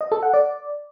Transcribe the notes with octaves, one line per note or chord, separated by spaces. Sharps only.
D#5
A4
F#5
D5